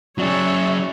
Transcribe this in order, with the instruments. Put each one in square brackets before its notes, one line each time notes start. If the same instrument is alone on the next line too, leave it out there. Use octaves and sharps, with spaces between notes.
[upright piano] C#3 D5 A6 [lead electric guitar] F#3 G#4 [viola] C#5 E5